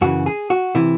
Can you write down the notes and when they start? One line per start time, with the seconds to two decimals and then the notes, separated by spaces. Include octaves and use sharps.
0.01 F#2 C#3 E3 F#4
0.26 G#4
0.50 F#4
0.75 C3 E3 E4